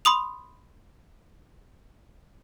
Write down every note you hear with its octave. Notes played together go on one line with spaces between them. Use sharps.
B5 C6 D#6 F7